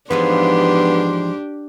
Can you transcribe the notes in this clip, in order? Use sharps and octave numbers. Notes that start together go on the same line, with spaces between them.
G#2 E3 F3 B3 D4 D#4 G4 C6